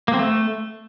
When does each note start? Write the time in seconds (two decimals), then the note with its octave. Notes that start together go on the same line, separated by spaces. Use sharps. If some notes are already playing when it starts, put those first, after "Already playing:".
0.08 A#3
0.14 C4
0.19 A3